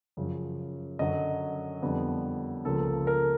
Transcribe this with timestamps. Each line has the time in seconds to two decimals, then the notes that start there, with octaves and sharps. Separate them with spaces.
0.17 F#2 C#3 F3
0.99 F#2 D3 F#3 D#5
1.82 F2 D3 G3 B3
2.65 C#2 C#3 F3 A#3 A4
3.07 A#4